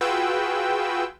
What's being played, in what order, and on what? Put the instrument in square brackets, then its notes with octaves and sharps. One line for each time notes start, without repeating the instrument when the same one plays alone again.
[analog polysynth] F4 F#4 G#4 B4 G5 E6